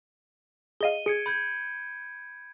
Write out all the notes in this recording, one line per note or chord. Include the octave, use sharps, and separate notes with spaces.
G#4 D#5 F5 D#7 G7
G#4 G#6 C#7 D7
B5 G6 G#6